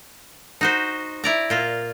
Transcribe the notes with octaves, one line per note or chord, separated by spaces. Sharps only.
D#4 F#4 C5
E4 D5 A#5
A#2 F4